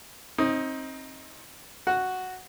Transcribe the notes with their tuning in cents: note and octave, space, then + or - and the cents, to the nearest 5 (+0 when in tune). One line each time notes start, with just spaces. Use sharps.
C4 +30 D#4 +15 D#6 +0
F#4 +0 F#5 +0